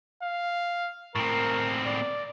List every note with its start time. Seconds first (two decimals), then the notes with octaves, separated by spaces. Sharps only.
0.23 F5
1.15 A2 C4 A#4
1.86 D5